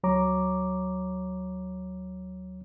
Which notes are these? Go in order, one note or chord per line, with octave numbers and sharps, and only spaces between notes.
D2 F#3 C#5 A#5 D6